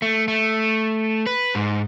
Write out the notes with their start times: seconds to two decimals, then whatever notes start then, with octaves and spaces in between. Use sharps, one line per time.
0.02 A3
0.28 A3
1.27 B4
1.55 G#2